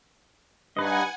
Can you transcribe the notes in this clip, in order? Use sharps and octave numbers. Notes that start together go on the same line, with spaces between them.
G2 D#4 B4 D#5 F#5 G#5 G#6